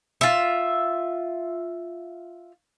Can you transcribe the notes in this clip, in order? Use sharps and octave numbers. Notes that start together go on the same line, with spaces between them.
F4 E5